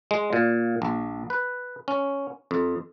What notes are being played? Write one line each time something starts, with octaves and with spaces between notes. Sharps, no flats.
G#3
A#2
A#1
B4
C#4
F2